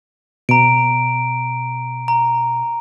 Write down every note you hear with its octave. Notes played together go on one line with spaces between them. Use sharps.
B2 A#5 D7
A#5